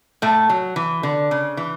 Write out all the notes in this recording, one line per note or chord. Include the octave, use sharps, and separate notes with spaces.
A2 A3
F#3
E3
D3
C#3
E3